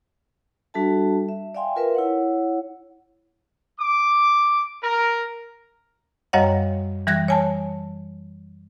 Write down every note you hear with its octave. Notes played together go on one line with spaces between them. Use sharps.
G3 D4 F#4 A4 E5 A5
E5
D5 E5 F5 G5 G#5 C6
F4 A#4 B4 E5
E4 C#5 F#5
D6
A#4
F#2 G3 C#5 D#5 F5 F#5
E3 G3 F#6 G#6 A#6
C#5 G#5 A5